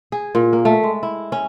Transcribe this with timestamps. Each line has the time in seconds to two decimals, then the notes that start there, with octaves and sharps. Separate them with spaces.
0.12 G#4
0.35 A#2
0.53 A#3
0.65 A3
0.83 G#3
1.03 E4
1.32 C#4